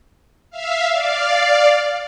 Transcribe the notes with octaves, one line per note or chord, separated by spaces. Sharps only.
E5 F5
D5 F5